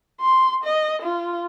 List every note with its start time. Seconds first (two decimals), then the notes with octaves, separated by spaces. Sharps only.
0.20 C6
0.63 D#5
1.02 F4